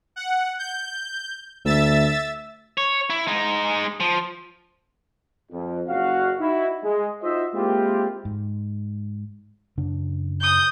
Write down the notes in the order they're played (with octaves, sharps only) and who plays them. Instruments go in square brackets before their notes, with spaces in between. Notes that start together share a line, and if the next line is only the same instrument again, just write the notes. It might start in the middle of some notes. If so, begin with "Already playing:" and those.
[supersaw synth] F#5
G6
[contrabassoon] D2 [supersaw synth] E5 E6 A6
[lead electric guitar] C#5
E4
G#3 D#4
F3
[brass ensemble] F2
F#1 F#4 F5
D#4 E4 F#4
G#3
D#4 F4 F#4 C5 D#5 E5
G#3 A#3 C4 E4 F4 G4
[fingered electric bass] G#2
F#2 C#3 D4
[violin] D#6 G6